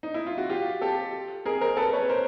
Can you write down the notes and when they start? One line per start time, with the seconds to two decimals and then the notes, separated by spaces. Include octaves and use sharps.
0.03 D#4
0.14 E4
0.26 F4
0.38 F#4
0.50 F4 G4
0.81 G4 A4
1.46 G#4 A#4
1.61 A#4 C5
1.77 A4 B4
1.93 B4 C#5
2.09 A#4 C5